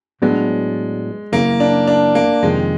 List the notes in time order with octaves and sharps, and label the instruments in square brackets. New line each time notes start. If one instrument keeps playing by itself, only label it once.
[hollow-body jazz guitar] A2 F#3 B3 D4 [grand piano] G#3
[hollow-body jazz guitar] F#2 C#3 E3 [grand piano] A#3
[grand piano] D4
D4
A#3
[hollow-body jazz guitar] F2 C3 D#3 [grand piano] G#3